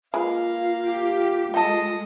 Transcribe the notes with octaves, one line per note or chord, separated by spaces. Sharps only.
G#3 A#3 F4 B4 F5
G4
G#3 A4 D#5 G5 A5